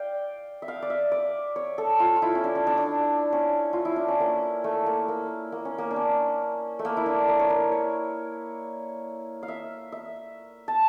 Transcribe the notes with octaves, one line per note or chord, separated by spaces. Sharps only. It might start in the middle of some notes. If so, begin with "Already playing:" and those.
Already playing: D5 F5 G5
E5
F5
D5
E5
D5
C#5
A4
F4
F4
E4
C#4
D4
C#4
D4
D4
C#4
F4
E4
D4
C#4
A#3
A3
A#3
A#3
A#3
C#4
A#3
D4
C#4
A3
A#3
E4
D4
A#4
C#5
A#4
C#5
F5
E5
E5
A5